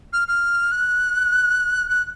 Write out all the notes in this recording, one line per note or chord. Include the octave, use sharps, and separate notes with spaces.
F6
F6
F#6
F#6